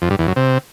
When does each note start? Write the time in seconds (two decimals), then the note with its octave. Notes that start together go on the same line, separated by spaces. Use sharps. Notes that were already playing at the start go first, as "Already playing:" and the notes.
0.02 F2
0.10 G2
0.19 E2
0.28 F#2
0.36 C3